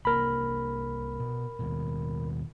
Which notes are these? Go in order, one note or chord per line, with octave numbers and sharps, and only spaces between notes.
C2 A#3 A#4 B5
B2
D#2 B2